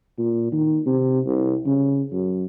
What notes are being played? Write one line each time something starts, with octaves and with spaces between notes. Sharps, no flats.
A#2
D#3
C3
C2
C#3
F#2